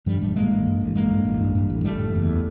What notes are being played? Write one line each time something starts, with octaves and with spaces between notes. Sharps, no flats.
G2 F3 G3
A1 G3 A3
A1 G#3 A#3
A1
G2
A1
A1 G#3 A#3
G2
A1
G2
G2
A1
F#1 G3 A3
F#1
E2